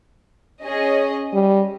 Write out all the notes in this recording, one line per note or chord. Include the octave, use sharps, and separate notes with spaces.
C#4 G#4 D#5
G3